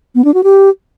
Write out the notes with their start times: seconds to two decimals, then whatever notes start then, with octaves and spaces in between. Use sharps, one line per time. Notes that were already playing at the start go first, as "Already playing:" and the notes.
0.15 B3
0.25 D4
0.34 F#4
0.44 G4